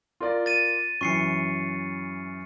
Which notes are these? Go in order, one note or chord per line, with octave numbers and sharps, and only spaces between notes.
F4 A#4 D5
A6 D#7
F#2 E3 C#6 C7 C#7